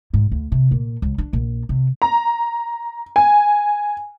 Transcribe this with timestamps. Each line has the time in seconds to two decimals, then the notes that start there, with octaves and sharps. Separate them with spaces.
0.14 G#2
0.31 D2
0.52 C3
0.71 A#2
1.02 C#2
1.18 D4
1.33 A#1
1.69 C3
2.02 A#5
3.16 G#5